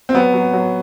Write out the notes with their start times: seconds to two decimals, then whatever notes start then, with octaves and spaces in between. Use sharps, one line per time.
0.09 C4
0.14 F#3 B3
0.33 F#3
0.53 F#3